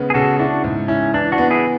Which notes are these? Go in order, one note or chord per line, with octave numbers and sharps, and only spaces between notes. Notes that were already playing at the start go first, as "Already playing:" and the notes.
Already playing: C#3 G#3 B3
G#4
C#3 F#4 A4
D4 E4 F#4
G#2
C#4 E4
E3 D4
D4 F#4
B3
E4 G#4